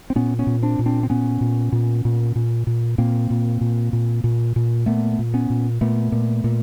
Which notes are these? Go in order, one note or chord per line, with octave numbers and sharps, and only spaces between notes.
C4
A#2 B3 C#4
B3 C#4
A#2
C4 D4
A#2
C4 D4
C4
A#2 B3 C#4
A#2
A#2
A#2
A#2
A#2
A#2 A#3 C4
A#2
A#2
A#2
A#2
A#2
A#2 A3 B3
A#2
B3 C#4
A#2
A#2 A3 B3
A#2
A#2